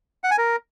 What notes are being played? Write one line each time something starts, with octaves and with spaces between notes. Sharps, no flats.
F#5
G#5
A#4